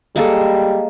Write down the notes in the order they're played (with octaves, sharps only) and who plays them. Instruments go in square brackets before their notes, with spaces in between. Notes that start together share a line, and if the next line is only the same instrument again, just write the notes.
[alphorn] G3 [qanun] G#3 A#3 A4